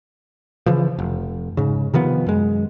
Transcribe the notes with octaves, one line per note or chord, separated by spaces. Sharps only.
C#3 E3 F3
F1
G#2 C#3
C3 D#3 F3 B3
F#2 G#3